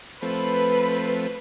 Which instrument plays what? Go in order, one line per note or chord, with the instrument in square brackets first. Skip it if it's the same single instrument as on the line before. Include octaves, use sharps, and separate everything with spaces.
[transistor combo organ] F3 A3 C4 [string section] B4